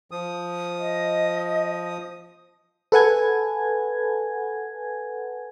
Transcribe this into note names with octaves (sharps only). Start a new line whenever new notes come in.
F3 D#6
D#5
A4 B4 F#5 G#5 G#6